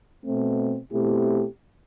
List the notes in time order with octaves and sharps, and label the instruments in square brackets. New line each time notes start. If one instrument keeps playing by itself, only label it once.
[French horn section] B2 A3 C4
B2 A3 C4 E4 G4